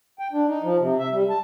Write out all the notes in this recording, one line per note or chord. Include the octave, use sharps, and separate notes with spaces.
G5
D4
D#4
F3
C3
E5
G3
A5